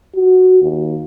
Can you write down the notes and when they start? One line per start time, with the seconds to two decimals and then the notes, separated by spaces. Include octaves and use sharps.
0.16 F#4
0.62 D#2